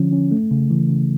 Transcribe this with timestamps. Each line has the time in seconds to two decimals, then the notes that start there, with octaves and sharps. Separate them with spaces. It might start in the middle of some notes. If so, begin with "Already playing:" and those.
Already playing: D3 F3 C#4
0.12 C#4
0.31 A3
0.51 C#3
0.70 E3
0.90 C#3